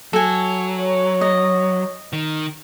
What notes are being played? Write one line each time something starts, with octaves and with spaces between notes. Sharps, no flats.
F#3 A4 G#5
C#5
D#5
D#3